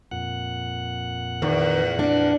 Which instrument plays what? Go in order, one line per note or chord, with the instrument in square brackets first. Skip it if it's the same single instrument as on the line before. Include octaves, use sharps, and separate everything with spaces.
[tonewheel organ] F2 A#2 F#5
[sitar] E2 [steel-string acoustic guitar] D#3
[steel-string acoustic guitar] D4